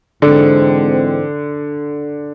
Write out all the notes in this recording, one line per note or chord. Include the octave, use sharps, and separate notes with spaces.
G#2 D3 E3 G#3 C4